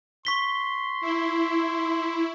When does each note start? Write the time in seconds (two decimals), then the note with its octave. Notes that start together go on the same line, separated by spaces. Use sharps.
0.25 C6 C#6 B6 G7
1.01 E4